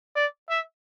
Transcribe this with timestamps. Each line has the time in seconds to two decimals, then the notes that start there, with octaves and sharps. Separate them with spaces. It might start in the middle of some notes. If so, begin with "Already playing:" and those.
0.15 D5
0.50 E5